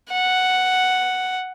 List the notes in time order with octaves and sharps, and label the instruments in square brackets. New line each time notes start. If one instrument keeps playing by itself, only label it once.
[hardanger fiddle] F#5